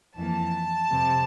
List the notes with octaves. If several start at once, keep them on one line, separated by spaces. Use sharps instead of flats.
F2 E3 A#3 A5
F2 C3 G3 C4